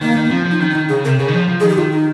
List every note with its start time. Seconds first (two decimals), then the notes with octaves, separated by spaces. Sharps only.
0.01 D#3 A#3
0.16 D#3
0.25 A#3
0.30 F3 C4
0.45 F3
0.51 D#4
0.60 D#3 C#4
0.70 C#4
0.75 D#3 D#4
0.89 C#3 G#4
1.04 C3 A#4
1.19 C#3 G#4
1.28 D#3
1.34 F3
1.49 F3
1.60 D#3 G#4
1.69 G4
1.78 D#3 F4
1.92 D#4